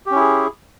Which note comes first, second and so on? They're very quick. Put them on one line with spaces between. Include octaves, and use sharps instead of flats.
G4 C#4 E4 G#4